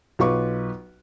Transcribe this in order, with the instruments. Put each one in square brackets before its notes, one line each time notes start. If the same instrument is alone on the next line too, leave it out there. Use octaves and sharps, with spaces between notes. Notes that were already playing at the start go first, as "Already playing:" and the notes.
[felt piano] B1 F4 B4 C#6 D6